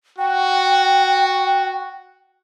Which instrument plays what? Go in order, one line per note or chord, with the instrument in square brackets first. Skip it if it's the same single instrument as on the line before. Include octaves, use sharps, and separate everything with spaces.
[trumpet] F#4 [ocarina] G5